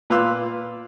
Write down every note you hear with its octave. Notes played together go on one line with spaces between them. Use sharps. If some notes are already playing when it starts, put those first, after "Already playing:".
A#2 B4 F5 C6 D6 E6